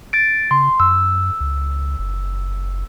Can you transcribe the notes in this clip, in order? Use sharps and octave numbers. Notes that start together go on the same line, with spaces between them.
A6 D7
C#3 C6
F#2 E6
C#2
F#1